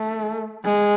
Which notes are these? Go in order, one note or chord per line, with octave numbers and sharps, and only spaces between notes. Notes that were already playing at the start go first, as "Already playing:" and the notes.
Already playing: A3
G#3